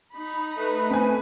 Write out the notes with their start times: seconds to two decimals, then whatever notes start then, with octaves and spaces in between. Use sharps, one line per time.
0.13 D#4 B5
0.56 A3 B4
0.90 C4 G#5